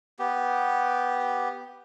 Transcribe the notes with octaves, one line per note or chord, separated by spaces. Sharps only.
B3 G4